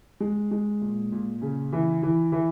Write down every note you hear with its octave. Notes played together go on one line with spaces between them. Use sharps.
G#3
G#3
A#2
A#2
C#3
E3
E3
E3